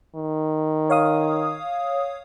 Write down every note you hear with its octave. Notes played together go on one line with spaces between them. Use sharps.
D#3
C#5 F5 D#6